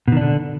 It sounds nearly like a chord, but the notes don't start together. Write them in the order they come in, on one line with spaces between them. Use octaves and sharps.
B2 D#3 D4 D3